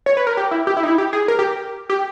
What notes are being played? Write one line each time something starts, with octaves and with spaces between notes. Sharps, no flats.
C#5
B4
A#4
G4
E4
G4
E4
D#4
E4
G4
G#4
A#4
G4
G4